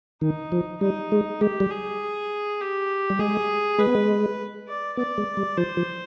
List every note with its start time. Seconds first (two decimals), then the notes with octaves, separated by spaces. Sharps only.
0.21 D#3 D#4
0.52 F3
0.81 G3 D#4
1.12 G#3
1.41 G#3 G4
1.60 G3
1.70 G#4
2.60 G4
3.10 G3
3.19 G#3 G#4
3.78 G#3 B4
3.87 B3
3.95 G#3
4.68 D5
4.97 B3 D5
5.18 G#3
5.37 G3
5.57 F3 C5
5.77 F3